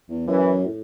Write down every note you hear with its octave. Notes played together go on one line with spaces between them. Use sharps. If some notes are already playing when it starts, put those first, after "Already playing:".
E2
F#2 E3
A2